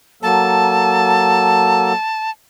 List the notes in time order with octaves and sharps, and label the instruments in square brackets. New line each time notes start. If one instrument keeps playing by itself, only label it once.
[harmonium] F#3 A#3 A4 [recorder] A5